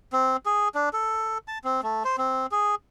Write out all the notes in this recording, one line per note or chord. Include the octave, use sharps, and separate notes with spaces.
C4
G#4
D4
A4
A5
C4
A3
C5
C4
G#4